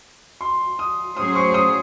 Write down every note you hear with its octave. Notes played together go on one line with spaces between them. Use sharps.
C6
D#6
A2 F#3 C#4 G#4 C5 D#6
C#6
D#6